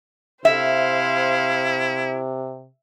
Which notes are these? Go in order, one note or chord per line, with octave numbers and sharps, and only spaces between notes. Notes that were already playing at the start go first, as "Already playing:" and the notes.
C3 E4 C5 E5 F5